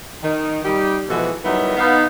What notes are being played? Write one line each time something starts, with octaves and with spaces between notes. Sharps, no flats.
D#3
G3 D#4 G4
B2 E3 F3 G#3 F#4 A4
D#3 F#3 G3 B3 D#4 E4
B3 D#4 F5